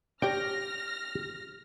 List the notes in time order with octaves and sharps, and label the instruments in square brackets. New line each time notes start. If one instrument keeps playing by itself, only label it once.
[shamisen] D4 G4 C#5 [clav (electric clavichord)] G5 [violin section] F6 A#6